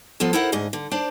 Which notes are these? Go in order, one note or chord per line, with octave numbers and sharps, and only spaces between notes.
F3 B3 F4 A4
E4 A4 A#4 C5 F#5
D2 G#2 G#4 D#5
D3
D4 C5 D5